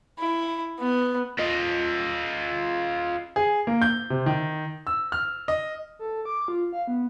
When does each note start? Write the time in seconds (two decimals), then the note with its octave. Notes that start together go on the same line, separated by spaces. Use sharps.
0.19 E4
0.80 B3
1.39 F4 D#5
3.36 G#4
3.67 A#3
3.82 G6
4.10 C3
4.26 D#3
4.87 E6
5.12 F6
5.48 D#5
5.99 A4
6.25 D6
6.48 F4
6.73 F5
6.88 B3